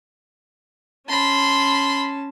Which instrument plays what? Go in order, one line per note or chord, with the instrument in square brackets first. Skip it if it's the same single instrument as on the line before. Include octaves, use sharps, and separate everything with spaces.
[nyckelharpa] C#4 A5 [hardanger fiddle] B5 C6